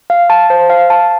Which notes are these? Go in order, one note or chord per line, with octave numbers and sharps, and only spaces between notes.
F5
A5
C5
F5
A5